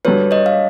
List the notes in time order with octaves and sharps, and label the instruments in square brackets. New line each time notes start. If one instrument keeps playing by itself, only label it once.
[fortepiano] G2 D3 F#3 [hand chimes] B4 C#5
[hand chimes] C#5 D#5
F5